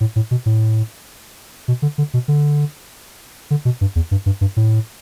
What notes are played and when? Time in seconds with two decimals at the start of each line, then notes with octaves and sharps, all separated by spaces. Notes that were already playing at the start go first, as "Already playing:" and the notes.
0.01 A2
0.16 A2
0.31 B2
0.46 A2
1.68 B2
1.82 D3
1.98 D3
2.14 B2
2.28 D3
3.51 D3
3.65 B2
3.81 G2
3.96 E2
4.11 G2
4.26 G2
4.41 G2
4.57 A2